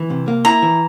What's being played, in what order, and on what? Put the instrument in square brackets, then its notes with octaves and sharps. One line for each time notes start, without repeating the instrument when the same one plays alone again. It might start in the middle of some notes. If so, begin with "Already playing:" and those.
Already playing: [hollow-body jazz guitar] E3
C3
A#3
[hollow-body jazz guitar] E4 [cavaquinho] A#5
[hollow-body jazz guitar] E3